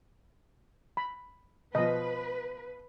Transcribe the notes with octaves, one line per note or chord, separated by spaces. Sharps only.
B5
B2 F3 B4 D#5